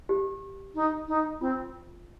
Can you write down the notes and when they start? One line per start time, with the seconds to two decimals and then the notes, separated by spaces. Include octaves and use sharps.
0.09 G4
0.75 D#4
1.08 D#4
1.41 C4 F4